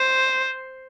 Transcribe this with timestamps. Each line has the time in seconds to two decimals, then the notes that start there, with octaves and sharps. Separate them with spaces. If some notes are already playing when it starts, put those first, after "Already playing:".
Already playing: C5